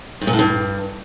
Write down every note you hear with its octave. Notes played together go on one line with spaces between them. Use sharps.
G2
A#2
A2
G2